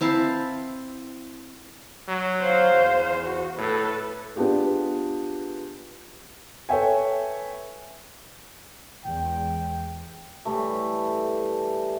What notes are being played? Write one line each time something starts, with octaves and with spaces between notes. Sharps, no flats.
C4 E4 F5 A5
F#3
C5 F5
E2
F#4
A2 A4 B4
B3 D4 F4 G4 G#4
A4 B4 C#5 E5 G5 G#5
E2 G#3 G5
A2 E3 G3 A3